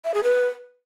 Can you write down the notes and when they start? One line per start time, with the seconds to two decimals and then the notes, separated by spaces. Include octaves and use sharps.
0.05 E5
0.14 G#4
0.24 B4